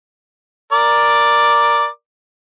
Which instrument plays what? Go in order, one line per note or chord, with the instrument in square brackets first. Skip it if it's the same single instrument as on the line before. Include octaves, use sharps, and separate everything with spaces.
[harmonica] A#4 D5 D6